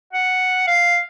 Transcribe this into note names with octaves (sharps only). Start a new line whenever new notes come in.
F#5
F5